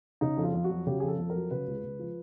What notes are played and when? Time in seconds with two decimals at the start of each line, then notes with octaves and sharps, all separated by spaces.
0.21 C#3 D#4
0.37 F2
0.43 F4
0.54 F2
0.64 F#4
0.70 F#3
0.86 C#3 G4
1.00 F2 G#4
1.08 A4
1.18 F2
1.30 A#4
1.35 F#3
1.51 C#3 B4
1.67 C#2
1.84 C#2
1.99 F3